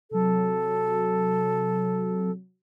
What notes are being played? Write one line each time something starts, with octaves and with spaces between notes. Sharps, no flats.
C3 F#3 A4